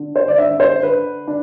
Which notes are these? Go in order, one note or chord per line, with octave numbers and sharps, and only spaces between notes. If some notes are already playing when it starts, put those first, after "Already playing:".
Already playing: D3
C5
D5
D3 E5
C5
D3 B4
D4